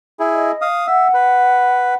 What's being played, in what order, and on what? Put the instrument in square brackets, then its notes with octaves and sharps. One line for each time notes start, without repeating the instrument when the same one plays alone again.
[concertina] E4 G#4
[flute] D#5
[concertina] F5 D#6
[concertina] E5 [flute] F#5
[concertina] B4